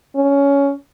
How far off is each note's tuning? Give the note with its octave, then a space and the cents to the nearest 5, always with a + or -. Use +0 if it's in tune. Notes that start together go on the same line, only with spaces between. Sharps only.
C#4 +15